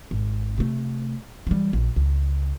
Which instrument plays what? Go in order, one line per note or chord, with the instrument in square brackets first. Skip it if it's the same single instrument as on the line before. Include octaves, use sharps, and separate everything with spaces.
[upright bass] G#1
C3 A3
E3 G3
A#1
C#2